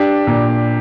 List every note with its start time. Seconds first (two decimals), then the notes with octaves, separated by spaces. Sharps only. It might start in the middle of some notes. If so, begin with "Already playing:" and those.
Already playing: D4 G4
0.27 A#2